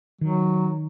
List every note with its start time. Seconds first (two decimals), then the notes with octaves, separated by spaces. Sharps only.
0.21 D#3 F#3